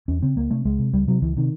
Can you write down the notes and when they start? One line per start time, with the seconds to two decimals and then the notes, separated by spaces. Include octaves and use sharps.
0.08 E2 C#4
0.22 C#3 C4
0.36 C#2 A#3
0.50 C3 A3
0.65 C#2 G#3
0.79 C3
0.93 C#2 G3
1.08 C3 F#3
1.22 C#2 E3
1.37 C3 D#3